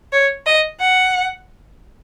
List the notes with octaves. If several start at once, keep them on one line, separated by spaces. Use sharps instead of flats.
C#5
D#5
F#5